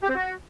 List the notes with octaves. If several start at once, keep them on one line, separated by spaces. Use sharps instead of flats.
G4
C4
F#4